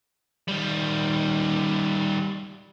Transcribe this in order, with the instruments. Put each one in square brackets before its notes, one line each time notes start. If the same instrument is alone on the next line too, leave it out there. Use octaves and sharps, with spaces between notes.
[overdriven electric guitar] D#3 G3